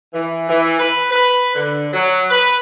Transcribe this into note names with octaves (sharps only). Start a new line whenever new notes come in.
E3
E3
B4
B4
D3
F#3
B4